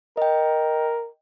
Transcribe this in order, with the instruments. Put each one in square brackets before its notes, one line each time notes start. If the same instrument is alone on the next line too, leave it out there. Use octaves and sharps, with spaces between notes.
[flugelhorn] A#4 [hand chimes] D#5 G5